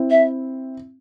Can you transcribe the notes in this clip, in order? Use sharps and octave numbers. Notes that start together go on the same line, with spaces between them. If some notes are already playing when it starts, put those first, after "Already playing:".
Already playing: C4 E4
E5